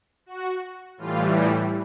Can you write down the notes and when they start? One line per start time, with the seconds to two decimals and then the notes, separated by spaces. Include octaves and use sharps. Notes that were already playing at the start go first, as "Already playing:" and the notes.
0.26 F#4
0.97 A2 E3 G3 F4